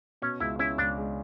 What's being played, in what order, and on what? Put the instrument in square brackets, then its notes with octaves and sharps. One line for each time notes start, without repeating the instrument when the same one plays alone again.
[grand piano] B2 [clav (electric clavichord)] C#4
[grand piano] C#2 [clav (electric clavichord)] E4
[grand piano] C#4 [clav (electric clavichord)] E4
[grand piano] C#2 [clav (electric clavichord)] D4
[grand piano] G#3